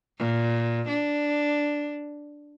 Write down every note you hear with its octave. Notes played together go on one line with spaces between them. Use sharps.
A#2
D4